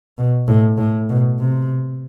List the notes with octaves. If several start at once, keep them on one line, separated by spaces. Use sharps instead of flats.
B2
A2
A2
B2
C3